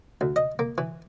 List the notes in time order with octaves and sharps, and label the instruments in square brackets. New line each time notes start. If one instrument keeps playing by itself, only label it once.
[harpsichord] D2
D#5
A#3
E3